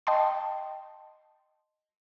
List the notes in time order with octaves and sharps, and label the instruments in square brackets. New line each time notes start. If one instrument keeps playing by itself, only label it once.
[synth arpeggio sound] D#5 G5 A5 C6